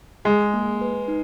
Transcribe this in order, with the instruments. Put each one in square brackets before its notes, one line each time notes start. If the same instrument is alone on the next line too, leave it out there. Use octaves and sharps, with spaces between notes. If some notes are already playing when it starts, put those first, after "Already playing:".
[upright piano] G#3 [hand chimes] G#4
[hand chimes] A#3
B4
D#4